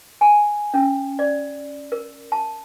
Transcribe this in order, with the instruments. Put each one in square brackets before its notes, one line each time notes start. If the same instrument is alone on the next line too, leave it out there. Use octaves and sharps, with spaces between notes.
[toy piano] G#5
C#4
D5
A#4
A5